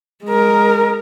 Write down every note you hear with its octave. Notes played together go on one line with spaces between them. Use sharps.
G#3 A#4